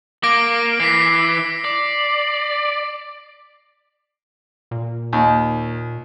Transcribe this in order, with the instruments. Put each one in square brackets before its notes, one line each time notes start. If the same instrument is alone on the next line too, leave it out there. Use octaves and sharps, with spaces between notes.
[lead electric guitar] A#3 [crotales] D6 A#6 D7
[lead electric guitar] E3 [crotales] B6 C7
[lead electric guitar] D5
[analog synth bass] A#2
[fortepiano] D#2